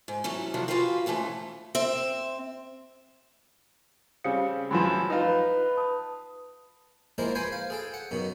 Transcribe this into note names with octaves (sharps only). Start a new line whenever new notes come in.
G#2
E3 F#3 A3 C#4
C3 D#3 F3 F#3 A3
F4 F#4 G#4 B4 F5 G5
D#2 G#2 E3 A3 C#4
C4 E5
C#3 G3 C4 F5 D#6 C#7
F#2 E3 F3 B5 C6 E7
D#4 F4 B4
A5 D#6
F3 G#3 A#3 E4 A#4 C5
B4 C5 G5 G#5 C6
F5
G#4 A4 G5
F#5
F#2 B2 D#3